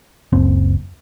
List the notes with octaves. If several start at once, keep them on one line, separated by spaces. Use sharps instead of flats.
F#1 C#2 C4